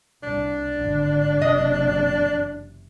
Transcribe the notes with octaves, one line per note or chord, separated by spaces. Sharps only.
C2 D4
G#1 D3
F#1 C3 E3 D#5